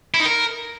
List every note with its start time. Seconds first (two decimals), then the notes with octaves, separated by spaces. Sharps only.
0.14 E4
0.20 D#4
0.25 A#4